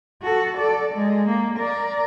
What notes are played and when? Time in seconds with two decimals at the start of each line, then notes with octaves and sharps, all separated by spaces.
0.22 F#4 A4
0.57 A4 D5
0.95 G#3
1.28 A#3
1.58 A#4 D5